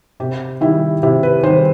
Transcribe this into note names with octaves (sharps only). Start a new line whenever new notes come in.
C3 G4
D#3 G3 E4
C3 E4
B4
D#3 G3 C5